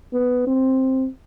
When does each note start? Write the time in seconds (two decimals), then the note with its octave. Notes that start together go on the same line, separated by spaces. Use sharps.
0.13 B3
0.47 C4